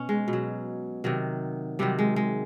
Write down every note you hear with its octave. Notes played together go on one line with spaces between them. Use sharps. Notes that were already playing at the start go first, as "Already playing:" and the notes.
Already playing: B2 C#4
G#3
B2
F#3
C3 D#3 F#3
C3 D#3 F#3 G3
G#3
G#3